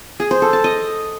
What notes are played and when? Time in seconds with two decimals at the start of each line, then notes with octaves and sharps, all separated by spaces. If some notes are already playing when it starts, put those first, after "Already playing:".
0.20 G#4
0.31 C5
0.42 A4
0.53 A5
0.64 D#5